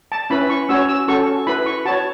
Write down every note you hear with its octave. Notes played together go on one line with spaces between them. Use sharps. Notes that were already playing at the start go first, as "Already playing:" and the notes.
A5
C#4 E4 B4 B5
C#6
C#4 F#4 C#5 E6
E6
C#4 F#4 A4 C#6
E4 B4 B5
C#6
F#4 C#5 A5